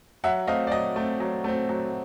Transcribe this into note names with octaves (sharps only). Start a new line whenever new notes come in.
F#3 E5 F#5
A3 C4 D#5 F5
D5
F#3 D#5
A3 C4
F#3
A3 C4
F#3